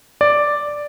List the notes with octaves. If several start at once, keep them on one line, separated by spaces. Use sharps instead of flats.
D5